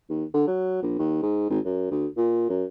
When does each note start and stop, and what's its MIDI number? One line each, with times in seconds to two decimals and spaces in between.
0.09 0.24 39
0.34 0.47 50
0.47 0.79 54
0.83 0.96 34
0.99 1.20 39
1.22 1.45 44
1.50 1.59 32
1.65 1.90 42
1.91 2.06 38
2.17 2.47 46
2.49 2.65 42